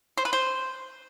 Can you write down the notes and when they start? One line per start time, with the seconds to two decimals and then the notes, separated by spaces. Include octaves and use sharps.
0.17 C5
0.25 B4
0.33 C5